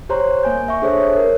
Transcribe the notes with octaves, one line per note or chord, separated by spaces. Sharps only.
G4 C5 C#5 A#5 C6
A#3 G#5 G6
E5 C#6
D4 G#4 A4 C5 C#5 E5
C#5
A#4